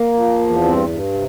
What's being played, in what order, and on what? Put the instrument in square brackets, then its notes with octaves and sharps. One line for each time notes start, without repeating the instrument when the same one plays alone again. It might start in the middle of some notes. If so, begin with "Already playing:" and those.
Already playing: [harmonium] A#3
F3
E2
G2 C4
G2
C3